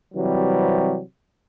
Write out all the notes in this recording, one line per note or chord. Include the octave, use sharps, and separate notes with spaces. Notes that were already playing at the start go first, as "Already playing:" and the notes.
C3 E3 F#3 G3 C4